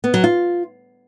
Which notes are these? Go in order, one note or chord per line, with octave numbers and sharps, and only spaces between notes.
B3
F#3
F4